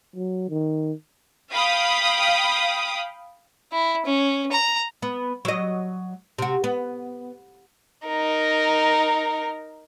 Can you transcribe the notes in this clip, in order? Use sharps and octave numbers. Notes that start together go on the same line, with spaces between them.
F#3
D#3
F5 G5 B5 D#6
E4
C#4
A#5
B3
F#3 D#5
C3 F#4
B3
D#4 A#4